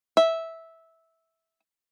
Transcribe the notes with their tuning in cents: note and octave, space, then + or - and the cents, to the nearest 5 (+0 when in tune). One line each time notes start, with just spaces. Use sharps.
E5 -10